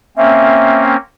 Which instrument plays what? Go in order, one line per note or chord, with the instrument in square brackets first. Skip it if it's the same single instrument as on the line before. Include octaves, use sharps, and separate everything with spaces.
[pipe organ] A#3 C4 C#4 [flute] E5